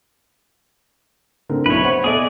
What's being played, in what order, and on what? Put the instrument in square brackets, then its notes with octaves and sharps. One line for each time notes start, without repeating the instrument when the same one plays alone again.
[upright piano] D3 C4 A#4
[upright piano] B1 E4 B5 [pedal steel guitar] B4 C#5
[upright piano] C5 F#5 B5
[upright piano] B2 A4 D#5 [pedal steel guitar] G#4 D5